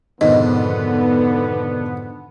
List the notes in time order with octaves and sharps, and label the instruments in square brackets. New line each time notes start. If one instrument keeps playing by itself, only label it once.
[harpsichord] F2 G#2 [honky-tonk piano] B2 D#3 [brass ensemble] D3 B3 [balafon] D#5